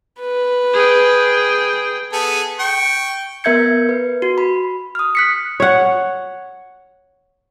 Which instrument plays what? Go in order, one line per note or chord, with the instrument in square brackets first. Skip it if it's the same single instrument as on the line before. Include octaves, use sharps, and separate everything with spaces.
[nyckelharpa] B4
[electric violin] G#4 G5
[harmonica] B3 G#4 A4
G5 C#6
[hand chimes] B3 A#4 E5 G6 G#6 C#7
B4
F#4
B5
D#6 F6
F#6 B6 C#7
[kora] C#5 F#5